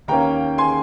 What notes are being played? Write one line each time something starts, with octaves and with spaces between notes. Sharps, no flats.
D#2 D#3 A#3 C#4 G5 A#5
G#5 C6